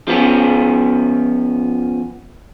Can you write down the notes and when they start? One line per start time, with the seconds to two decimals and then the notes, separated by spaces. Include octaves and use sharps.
0.08 F3 B3 C#4